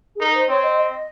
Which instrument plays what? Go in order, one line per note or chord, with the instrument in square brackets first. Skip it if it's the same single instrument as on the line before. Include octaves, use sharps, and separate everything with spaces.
[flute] G#4
[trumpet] D#4 [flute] A#4
[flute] C5
[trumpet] C4 [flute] C#5
[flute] D#5
D#5